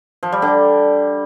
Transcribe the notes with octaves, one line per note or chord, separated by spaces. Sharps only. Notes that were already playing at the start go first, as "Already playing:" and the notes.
F3
G3
D3